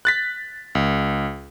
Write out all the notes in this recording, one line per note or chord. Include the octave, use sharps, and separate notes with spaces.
F#6 A6 B6
C#2